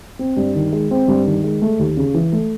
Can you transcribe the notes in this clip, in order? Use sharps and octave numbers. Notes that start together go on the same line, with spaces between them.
C4
G2
D#3
G#3
C4
G2
D#3
G#3
A3
D#2
C#3
E3
A3